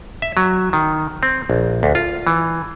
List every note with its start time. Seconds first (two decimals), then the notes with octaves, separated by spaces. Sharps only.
0.22 E5
0.37 F#3
0.73 D#3
1.23 C4
1.50 A#1
1.83 D2
1.95 F4
2.27 E3